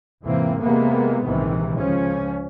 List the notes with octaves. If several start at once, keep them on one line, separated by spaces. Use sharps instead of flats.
E2 G#2 C3 E3 A#3 C4
C3 E3 G#3 A#3 B3
A#1 G#2 C3 D#3 E3
C#2 F3 C#4